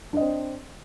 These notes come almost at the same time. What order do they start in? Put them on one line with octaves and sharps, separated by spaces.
D4 D#5 C4